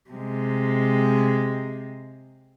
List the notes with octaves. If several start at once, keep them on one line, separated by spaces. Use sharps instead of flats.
C3 G#3